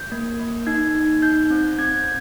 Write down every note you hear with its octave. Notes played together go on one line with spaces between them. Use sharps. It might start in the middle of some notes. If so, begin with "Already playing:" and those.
Already playing: G6
A#3
A#3
D#4 G#6
D#4
D#4 G6
G6
C4
G6
C4 G#6